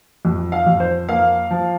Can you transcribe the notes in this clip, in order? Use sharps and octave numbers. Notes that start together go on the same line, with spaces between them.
F2
F5
F2
C5
A#3 F5
F3